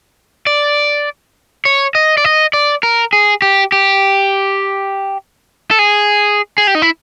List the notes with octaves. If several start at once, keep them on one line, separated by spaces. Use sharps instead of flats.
D5
C#5
D#5
D5
D#5
D5
A#4
G#4
G4
G4
A4
G#4
G#4
G4
D#4
E4